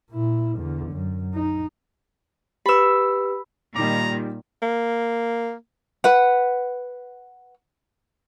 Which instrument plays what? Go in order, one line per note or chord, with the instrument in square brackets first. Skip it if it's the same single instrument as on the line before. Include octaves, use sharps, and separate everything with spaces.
[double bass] A#2 E4
E2 D3
F#2
D#4
[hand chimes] G4 B4 [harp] B5 E6
[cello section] A#2 D#3 A#3 [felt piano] G3 D#4 D6 [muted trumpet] A#5
[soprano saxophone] A#3
[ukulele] B4 F#5